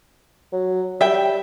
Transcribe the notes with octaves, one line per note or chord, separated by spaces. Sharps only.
F#3
G3 E5 G5